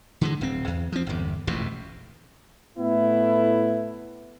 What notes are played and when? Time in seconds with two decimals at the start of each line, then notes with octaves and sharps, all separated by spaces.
0.21 D3 E3 G#3
0.41 D1 C4
0.67 E2
0.92 F3 C4
1.06 G1 E2
1.47 E1 A1 F2 B2
2.78 A2 A3 B3 E4